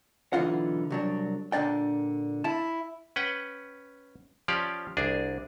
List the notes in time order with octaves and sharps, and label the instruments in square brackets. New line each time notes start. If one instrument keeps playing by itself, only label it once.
[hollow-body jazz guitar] B1 D3 E3 F4 F#5
C2 F#3 D4
A#2 D3 D4 D5 G5
E4 A5
[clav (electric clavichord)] C#4 B4 F#5 G5
F3 C#4 G4 D5 F5
C2 D4 G#4